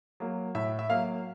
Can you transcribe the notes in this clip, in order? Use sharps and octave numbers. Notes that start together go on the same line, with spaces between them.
F#3 A#3
A2 E5
E5
F#3 A#3 F5